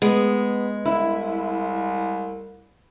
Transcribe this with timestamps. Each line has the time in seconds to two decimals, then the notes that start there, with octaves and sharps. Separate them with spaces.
0.02 G#3 B3
0.86 C2 E4